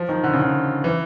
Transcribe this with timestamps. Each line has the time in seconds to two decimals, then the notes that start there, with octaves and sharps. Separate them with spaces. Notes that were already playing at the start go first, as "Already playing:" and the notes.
Already playing: F3
0.09 D#3
0.24 D3
0.33 C#3
0.41 D3
0.84 E3